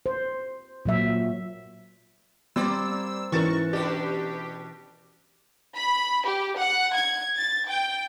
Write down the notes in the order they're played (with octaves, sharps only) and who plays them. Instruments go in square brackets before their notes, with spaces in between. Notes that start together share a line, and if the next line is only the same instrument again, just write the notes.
[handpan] C5
A#2 F#3 E5
[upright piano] G3 C4 [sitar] A#3 C5 D5 [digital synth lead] E6
[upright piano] G#2 A6 E7 [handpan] E3 C#4 A#4 [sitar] F#4 [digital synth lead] C#6
[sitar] B2 D4 F#4 [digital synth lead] G4 [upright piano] D5
[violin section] B5
G4
F#5
G#6
A6
G5